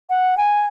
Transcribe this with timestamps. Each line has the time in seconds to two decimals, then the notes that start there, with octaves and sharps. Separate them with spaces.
0.10 F#5
0.37 G#5